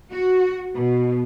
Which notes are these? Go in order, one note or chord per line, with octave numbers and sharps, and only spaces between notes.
F#4
B2